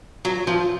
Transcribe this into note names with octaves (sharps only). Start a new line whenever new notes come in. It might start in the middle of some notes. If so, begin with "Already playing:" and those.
F#3
F3